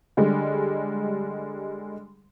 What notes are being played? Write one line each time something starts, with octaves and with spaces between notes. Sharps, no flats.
D3 G3 G#3